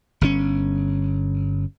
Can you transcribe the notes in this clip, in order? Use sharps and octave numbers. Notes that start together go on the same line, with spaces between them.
G1 D3 C#4